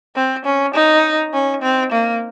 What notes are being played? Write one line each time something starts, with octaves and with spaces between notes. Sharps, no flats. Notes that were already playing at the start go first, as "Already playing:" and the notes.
C4
C#4
D#4
C#4
C4
A#3